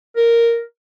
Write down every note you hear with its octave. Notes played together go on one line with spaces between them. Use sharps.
A#4